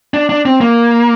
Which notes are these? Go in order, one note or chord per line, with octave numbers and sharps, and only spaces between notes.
D4
D4
C4
A#3